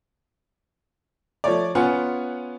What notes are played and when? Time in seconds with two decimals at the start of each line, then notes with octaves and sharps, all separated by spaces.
1.44 F3 A3 C#5 D5
1.75 B3 C#4 F4 F#5 G#5